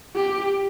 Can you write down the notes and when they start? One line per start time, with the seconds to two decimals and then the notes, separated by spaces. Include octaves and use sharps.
0.16 G4